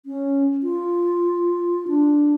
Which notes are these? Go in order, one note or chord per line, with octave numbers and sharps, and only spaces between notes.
C#4
F4
D4